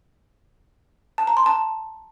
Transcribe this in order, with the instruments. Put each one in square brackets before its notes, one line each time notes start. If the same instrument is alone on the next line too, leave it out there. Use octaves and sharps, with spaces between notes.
[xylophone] A5
A#5
C6
A5